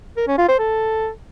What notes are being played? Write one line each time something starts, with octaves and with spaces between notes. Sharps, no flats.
A#4
C#4
F4
C5
A4